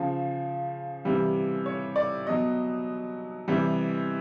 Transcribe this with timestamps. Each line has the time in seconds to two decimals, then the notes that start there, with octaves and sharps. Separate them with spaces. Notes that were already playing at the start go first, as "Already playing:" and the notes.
Already playing: C#3 F3
1.05 C3 E3 G3
1.66 C#5
1.96 D5
2.27 B2 F#3 D#5
3.48 C3 E3 G3